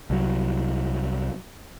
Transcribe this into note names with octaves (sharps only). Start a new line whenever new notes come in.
C2 F#3